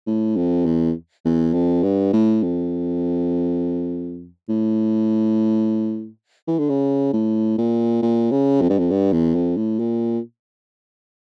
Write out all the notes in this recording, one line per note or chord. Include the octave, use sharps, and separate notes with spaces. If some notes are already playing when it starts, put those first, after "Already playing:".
A2
F2
E2
E2
F2
G2
A2
F2
A2
E3
D3
C#3
A2
A#2
A#2
C#3
F2
G2
F2
G2
E2
F2
A2
A#2